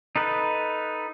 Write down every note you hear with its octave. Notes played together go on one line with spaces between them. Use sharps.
D#4 A4 B4